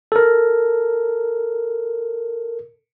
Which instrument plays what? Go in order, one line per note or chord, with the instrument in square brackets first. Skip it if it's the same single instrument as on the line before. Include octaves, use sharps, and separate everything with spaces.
[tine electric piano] A4 A#4